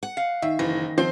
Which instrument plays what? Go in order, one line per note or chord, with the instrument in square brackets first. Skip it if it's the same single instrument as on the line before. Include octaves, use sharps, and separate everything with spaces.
[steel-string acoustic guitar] F#5
[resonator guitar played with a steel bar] F5
[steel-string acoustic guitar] D#3 [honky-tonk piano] E5
[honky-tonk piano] F#1 E3 A#6 [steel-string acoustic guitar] D#3
[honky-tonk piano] F3 C4 [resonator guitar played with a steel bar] C5